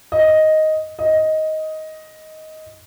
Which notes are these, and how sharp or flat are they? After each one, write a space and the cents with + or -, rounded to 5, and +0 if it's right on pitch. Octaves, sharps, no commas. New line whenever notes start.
D#5 +5
D#5 +10